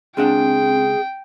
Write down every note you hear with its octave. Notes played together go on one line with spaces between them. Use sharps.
C#2 C4 D4 G#4 F#5 G5